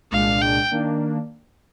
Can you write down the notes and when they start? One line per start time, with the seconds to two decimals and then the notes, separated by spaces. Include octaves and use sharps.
0.11 C2 A#2 G#3 D4 F5
0.42 G5
0.71 D#3 A#3 D4